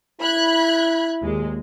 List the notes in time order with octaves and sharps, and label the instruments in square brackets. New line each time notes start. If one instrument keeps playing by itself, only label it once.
[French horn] E4 [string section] B5 F#6 G#6
[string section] D#2 A#2 G#3